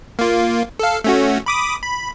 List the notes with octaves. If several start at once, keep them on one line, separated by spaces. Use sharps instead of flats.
A#3 F4
A4 F5
A3 C#4 F#4
B5 D6 D#6
B5